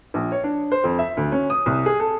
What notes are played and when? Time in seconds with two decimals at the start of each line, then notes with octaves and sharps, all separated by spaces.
0.14 A#1
0.32 C#5
0.44 D4
0.72 C5
0.84 F2
0.99 E5
1.17 D2
1.32 C#4
1.50 D#6
1.66 C2
1.86 G#4
2.00 A4